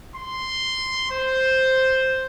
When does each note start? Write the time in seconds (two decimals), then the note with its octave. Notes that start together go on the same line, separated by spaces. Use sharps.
0.16 C6
1.11 C5